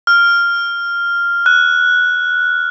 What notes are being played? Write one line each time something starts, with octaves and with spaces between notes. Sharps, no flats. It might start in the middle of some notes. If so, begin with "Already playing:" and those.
F6
F#6